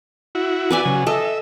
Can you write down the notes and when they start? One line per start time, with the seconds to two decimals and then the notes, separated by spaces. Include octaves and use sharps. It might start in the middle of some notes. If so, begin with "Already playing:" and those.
0.35 E4 F#4
0.71 B4 D5 G#5
0.85 C#3 F#3
1.07 A4 D#5 E5